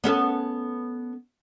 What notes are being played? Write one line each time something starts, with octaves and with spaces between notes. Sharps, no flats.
B3 C#4 A4